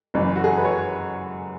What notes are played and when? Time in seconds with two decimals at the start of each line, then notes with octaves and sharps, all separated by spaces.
0.14 F#1 F#2 E3
0.36 F#4
0.44 G#4
0.50 A4
0.57 B4
0.65 C#5